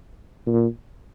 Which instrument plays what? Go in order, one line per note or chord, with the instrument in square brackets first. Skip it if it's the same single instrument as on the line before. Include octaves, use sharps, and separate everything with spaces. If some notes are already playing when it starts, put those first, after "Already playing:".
[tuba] A#2